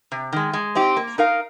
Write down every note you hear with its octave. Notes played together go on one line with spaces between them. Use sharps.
C3
D#3 G#3
G#3
C4 D#4 G4
A#3
D#4 A#4 F5